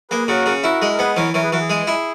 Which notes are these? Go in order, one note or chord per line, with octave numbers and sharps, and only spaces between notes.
A#3 G#4 B4
C#3 F#4 A#4
C#3
E4 F#4 A#4
G#3
A#4
B3 G#4 B4
E3 A#4 C#5
E3 A#4 C#5
G#4 B4
E3 F#4 A#4
G#4
G#3
E4